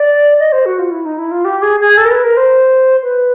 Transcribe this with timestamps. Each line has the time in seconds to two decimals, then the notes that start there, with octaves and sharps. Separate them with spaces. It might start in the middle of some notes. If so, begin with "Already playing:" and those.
Already playing: D5
0.40 D#5
0.52 C5
0.66 F#4
0.79 F4
0.92 E4
1.05 D#4
1.19 E4
1.31 F4
1.45 G4
1.62 G#4
1.80 G#4
1.97 A4
2.05 A#4
2.11 B4
2.24 A#4
2.37 C5
3.03 B4